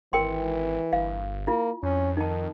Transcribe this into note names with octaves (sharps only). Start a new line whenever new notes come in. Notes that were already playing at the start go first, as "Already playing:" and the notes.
G#1 E3 A#4 G5 C6
G1 F5
A#3 E4 F4
F2 C#4
D#3 D#4 A5